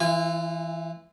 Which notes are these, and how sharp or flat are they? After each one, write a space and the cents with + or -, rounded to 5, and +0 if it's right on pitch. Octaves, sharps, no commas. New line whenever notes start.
E3 +0 F4 -40 G#5 -30